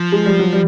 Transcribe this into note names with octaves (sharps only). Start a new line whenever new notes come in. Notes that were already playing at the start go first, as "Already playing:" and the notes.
Already playing: F3
G#3
G3
F#3
G3